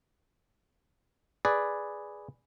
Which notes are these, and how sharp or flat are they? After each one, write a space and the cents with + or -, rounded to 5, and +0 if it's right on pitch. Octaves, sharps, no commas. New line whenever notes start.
G#4 +0 B4 +0 D5 +0